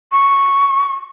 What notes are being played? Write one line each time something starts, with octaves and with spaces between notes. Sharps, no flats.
C#6